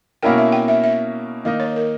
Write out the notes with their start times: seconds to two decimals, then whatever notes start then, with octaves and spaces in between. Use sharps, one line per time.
0.23 B2 A#3 C#4 E4 A#4 G5
0.38 E5
0.52 G5
0.68 E5
0.84 E5
1.45 D#3 A#3 D#4 D#5
1.60 C#5
1.76 A#4